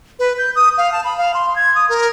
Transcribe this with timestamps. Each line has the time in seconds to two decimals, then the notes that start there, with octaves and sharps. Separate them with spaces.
0.19 B4
0.38 G6
0.56 D#6
0.78 F5
0.92 A5
1.04 B5
1.18 F5
1.34 C6
1.56 G#6
1.75 D#6
1.89 A#4